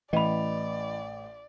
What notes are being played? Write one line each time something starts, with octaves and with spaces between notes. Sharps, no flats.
A1 E3 D5 D#5 B5 F7